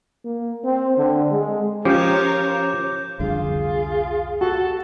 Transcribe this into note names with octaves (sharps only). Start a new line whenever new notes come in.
A#3
C4
D3
G#3
F3 C#4 F4 G4 A#4 C#5 D6 G6
F1 C2 D3 F4 G#4
F#4 A4